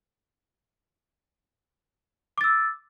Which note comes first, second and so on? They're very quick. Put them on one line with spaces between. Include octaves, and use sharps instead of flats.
D6 A6 E6